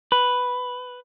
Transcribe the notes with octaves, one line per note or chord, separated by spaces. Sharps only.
B4